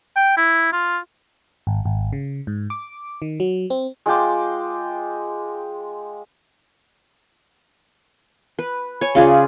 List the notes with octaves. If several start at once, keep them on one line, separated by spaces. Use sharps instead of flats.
G5
E4
F4
G#1
G#1
C#3
G#2
D6
D#3
F#3
C4
G#3 F4 G5 D6
B4
C#5 G#5
C#3 F4 G#4 D5